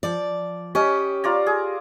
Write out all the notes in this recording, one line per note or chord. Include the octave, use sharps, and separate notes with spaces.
F3 D5
C#4 G4 D#5
F4 D5 A#5
G#4